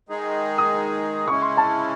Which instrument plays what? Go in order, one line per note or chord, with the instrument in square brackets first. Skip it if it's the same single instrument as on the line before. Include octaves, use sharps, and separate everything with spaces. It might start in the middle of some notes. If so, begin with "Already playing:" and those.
[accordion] D#3 G#3 D#4 G#4
[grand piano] D#6
[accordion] C#3 G#3 C#4 E4 [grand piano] C#6
[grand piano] C6
A5